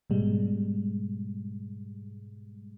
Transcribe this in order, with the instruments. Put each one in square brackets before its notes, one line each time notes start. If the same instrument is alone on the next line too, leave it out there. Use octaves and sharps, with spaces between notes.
[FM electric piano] G#2 B2 G3 G#3